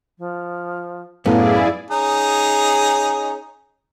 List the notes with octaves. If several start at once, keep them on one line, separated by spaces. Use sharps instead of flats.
F3
F#2 A2 B3 E4 G#4 D5 F5
C#4 D#4 G#4